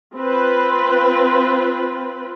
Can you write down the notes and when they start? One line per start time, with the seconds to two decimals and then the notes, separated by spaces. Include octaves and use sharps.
0.16 C4 F4 B4